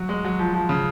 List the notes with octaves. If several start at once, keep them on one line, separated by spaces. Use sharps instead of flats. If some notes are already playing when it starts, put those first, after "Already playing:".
Already playing: F#3
G#3
F#3
F3
F3
C#3